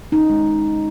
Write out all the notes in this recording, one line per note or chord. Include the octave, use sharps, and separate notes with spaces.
C#4 D#4
G#3